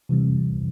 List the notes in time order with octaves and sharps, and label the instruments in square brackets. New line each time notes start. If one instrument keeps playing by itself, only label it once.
[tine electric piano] C3 E3 G3 C4